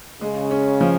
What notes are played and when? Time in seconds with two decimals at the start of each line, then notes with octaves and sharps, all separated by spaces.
0.21 C#3 G#3
0.51 C#4
0.81 F3